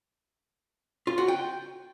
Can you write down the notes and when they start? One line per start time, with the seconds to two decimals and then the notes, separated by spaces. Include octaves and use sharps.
1.07 F4
1.18 F#4
1.28 G5